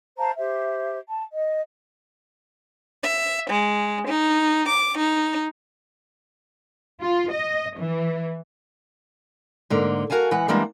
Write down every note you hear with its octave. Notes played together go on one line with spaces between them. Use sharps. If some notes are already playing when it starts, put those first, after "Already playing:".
C5 F5 A5 A#5
G4 C5 E5
A5
D#5
E5
G#3
D#4
D6
D#4
F4
D#5
E3
G#2 D3 A#3
F#4 A#4 F5 G#5 A5
E3 G#3 B4 F#5
E3 G3 G#3 A#3 D4